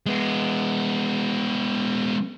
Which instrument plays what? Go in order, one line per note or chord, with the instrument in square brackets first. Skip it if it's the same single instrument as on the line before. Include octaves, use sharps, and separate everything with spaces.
[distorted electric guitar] G#3 B3